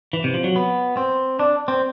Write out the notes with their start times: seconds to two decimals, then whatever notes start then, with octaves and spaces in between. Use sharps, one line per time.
0.13 E3
0.24 C3
0.34 F3
0.44 F#3
0.56 B3
0.97 C4
1.39 D4
1.68 C4